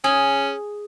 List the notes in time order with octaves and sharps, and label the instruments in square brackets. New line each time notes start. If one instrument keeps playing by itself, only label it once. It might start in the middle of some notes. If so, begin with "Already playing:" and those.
[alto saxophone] C#4 [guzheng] G#4